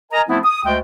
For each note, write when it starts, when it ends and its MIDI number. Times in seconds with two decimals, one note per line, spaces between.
0.12 0.22 70
0.12 0.22 75
0.12 0.22 80
0.12 0.22 82
0.28 0.38 53
0.28 0.38 57
0.28 0.38 59
0.28 0.38 60
0.28 0.38 64
0.44 0.61 87
0.65 0.77 38
0.65 0.77 56
0.65 0.77 57
0.65 0.77 79